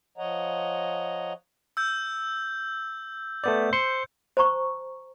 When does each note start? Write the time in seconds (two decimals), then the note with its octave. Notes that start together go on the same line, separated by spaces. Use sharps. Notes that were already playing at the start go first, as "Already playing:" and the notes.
0.18 F3 C#5 D#5 F#5 A#5
1.77 E6 G6
3.44 A3 B3 D5 G6
3.73 C5 C6 C#7
4.37 C5 A5 A#5 C#6